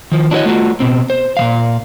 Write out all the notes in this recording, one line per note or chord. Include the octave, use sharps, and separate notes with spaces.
D#3 F3
D4 E4 F#4 A4 C#5 D#5
A3 F4 F#4
B2 C4
C5
A#2 E3 F5